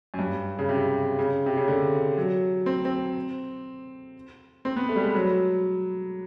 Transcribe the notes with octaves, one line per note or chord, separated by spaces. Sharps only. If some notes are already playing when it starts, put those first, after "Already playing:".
F#2
G2
C#3
C3
C#3
C3
C#3
D3
F#3
C4
C4
C4
B3
A3
G3
G#3
F#3